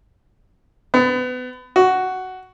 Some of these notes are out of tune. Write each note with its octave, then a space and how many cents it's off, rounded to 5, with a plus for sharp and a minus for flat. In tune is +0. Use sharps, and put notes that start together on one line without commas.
B3 +30
F#4 +10